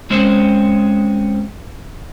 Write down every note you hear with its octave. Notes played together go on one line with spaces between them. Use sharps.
G#3 C4 C#4 C5